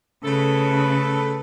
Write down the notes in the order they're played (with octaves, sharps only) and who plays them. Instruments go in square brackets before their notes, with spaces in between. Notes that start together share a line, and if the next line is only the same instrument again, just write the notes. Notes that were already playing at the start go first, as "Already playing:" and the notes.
[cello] C#3 [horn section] A3 A4 B4